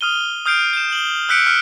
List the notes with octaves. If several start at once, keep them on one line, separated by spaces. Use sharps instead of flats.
D#6 F6 D#7 G7
D#6 F6 G6 C7 D7
G6 E7
F#7 G7
E6 F#6 G6 B6 C#7 D7
F6